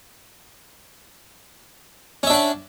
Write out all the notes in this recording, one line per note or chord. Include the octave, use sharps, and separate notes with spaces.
C#4 D4 E5 F#5